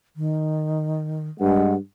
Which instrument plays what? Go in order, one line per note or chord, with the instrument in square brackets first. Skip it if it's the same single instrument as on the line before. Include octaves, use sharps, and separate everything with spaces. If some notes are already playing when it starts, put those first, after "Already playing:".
[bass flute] D#3
[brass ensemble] G2 G#3 [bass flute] F#5